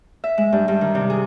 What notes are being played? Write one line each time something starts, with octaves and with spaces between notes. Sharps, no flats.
E5
G#3
G2
G2
D#3
C3
G#4